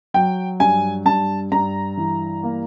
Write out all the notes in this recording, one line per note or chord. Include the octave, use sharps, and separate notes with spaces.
F#3 G5
G2 G#5
G2 A5
G2 A#5
E3
A#3